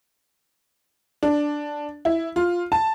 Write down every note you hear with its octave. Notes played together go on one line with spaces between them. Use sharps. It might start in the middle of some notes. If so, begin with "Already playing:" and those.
D4
E4
F4
A5